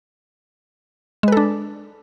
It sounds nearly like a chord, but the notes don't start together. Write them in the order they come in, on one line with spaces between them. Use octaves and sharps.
G#3 B4 A4 D4